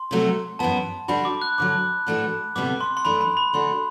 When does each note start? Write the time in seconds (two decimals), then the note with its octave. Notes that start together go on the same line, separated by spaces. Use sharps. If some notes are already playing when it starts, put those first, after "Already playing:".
Already playing: C6
0.11 C3 F#3 A3 C4 F#4
0.59 F#2 E3 B3 A5
1.08 D3 G3 D4 F#4 B5
1.25 D6
1.42 F#6
1.58 D2 D3 F#3 D6
2.07 A2 E3 A3 D4 F#4
2.56 D2 C3 G3 B3 D6
2.81 C6
2.97 C6
3.05 F#2 E3 A3 D4 B5
3.21 B5
3.37 B5
3.53 D3 A3 D4 F#4 C6